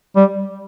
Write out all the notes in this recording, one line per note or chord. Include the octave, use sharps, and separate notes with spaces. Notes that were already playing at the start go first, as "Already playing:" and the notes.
G3